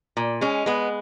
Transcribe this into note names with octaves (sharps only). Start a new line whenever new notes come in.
A#2
G#3 C#4
G#3 B3